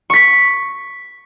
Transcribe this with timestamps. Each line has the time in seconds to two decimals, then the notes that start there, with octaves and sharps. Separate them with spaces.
0.10 C#6 B6